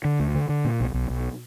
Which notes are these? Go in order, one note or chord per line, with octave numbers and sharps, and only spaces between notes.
D3
D2
D3
D3
A#2
B1
B1
B1